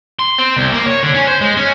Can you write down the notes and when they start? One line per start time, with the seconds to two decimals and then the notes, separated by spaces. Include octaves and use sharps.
0.19 C6
0.38 C4
0.56 C2
0.72 A#3
0.86 C#5
1.03 D3
1.14 C#4
1.27 C5
1.41 G#3
1.57 C#4